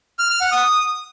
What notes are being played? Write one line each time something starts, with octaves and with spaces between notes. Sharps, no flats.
F6
F6
F#5
D#6